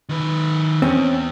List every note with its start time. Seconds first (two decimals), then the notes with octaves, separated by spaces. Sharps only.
0.09 D#3 B4
0.82 E2 C4 C#4